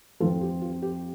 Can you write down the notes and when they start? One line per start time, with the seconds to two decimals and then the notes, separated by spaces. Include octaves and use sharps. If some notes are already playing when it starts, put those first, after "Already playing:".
0.20 F2 F3 C4 F4 A4
0.41 G4
0.62 F4
0.82 G4